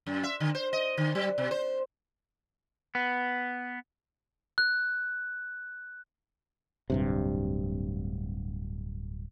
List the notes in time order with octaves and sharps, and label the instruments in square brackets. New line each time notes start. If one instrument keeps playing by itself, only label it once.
[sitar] F#2
E5
D3
C5
D#5
D3
F#3
B2
C5
[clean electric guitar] B3
[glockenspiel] F#6
[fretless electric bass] D1 G2 C3